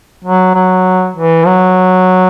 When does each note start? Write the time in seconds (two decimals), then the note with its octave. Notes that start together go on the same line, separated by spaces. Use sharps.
0.24 F#3
0.55 F#3
1.16 E3
1.46 F#3